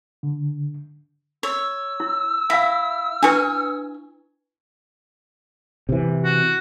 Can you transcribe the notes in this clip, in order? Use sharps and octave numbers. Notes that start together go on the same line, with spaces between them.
D3
C#5 E6
E4
E4 E5 F5
D4 E4 B4 G#5 C#6
C3 E3
F#4